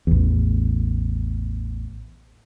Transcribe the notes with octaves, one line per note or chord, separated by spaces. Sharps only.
A1 E2